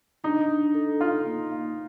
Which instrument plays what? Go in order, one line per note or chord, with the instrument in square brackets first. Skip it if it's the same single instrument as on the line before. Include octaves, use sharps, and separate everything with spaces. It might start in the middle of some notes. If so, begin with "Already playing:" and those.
[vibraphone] D4 [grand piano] D#4
[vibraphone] D4
A4
[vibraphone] D#4 [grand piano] F4
[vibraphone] A#3
F5